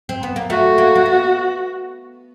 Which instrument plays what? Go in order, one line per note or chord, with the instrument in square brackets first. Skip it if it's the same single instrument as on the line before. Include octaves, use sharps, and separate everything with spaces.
[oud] C4
B3
A#3
[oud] A3 [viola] F#4
[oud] A#3
A#3
B3